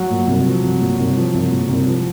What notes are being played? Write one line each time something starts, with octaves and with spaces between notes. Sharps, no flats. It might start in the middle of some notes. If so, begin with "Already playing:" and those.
Already playing: F#3 F#4
A#2
C2
F3
C2
A#2
C2
F3
C2
A#2
C2
F3